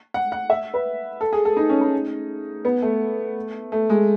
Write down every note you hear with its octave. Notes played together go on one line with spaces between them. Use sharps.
F#5
F#5
E5
B4
A4
G#4
A4
D#4
C#4
D#4
B3
A3
A3
G#3